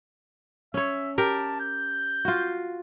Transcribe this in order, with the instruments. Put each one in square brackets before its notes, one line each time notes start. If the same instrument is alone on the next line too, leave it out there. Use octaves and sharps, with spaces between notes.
[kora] C#4 C#5 [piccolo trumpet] E5
[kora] G4 A#4 [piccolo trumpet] A5
[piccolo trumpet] G6
[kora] F4 F#4